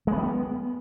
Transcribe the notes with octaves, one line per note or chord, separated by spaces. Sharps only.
G#3
B3
G3
B3